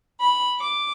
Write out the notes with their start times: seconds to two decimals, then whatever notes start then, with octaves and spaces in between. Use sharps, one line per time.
0.21 B5
0.59 D6